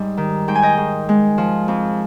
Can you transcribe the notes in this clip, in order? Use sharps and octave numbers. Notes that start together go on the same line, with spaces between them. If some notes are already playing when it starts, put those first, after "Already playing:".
Already playing: G#2 G3 D#5
D#3
G#2 G5
G#5
D#5 G5
G#2
G#3
F3
F2